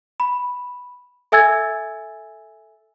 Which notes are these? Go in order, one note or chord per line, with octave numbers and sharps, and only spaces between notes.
B5
A4 E5 G#5 E6 G#6 A6